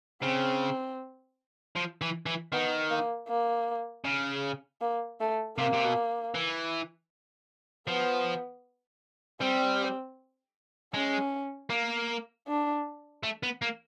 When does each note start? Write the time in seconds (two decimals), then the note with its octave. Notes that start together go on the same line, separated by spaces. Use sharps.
0.22 C#3 C4
1.76 F3
2.01 E3
2.26 E3
2.52 D#3 B3
2.90 A#3
3.28 A#3
4.05 C#3
4.81 A#3
5.20 A3
5.58 C3 A#3
5.73 C3
5.84 B2
6.34 E3
7.87 F3 B3
9.41 G3 C4
10.94 G#3 C#4
11.70 A#3
12.48 D4
13.23 A3
13.43 B3
13.62 A#3